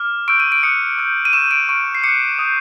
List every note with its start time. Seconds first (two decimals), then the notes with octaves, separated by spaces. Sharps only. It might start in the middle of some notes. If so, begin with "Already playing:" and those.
Already playing: D6 F6
0.28 C#6 E6 G6 D7
0.40 D#7
0.52 D7
0.63 D#6 F#6 C#7
0.98 C#6 E6 G6
1.25 D#7
1.33 C#6 E6 G6 E7
1.51 D7
1.69 C#6 F6 D7
1.95 C7
2.04 D6 F#6 C#7
2.39 D#6 G6